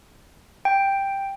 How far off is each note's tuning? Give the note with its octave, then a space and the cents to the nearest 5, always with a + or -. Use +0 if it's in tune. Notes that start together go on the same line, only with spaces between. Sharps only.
G5 +5